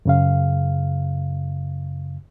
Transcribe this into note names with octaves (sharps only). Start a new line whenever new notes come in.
F#2 C#3 F5